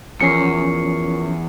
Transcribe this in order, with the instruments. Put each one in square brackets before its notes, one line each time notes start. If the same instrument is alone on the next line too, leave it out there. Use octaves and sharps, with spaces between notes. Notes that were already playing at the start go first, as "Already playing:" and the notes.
[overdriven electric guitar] E2 [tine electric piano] F3 C#4 [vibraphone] F4 A#4 C#6 [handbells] C7 C#7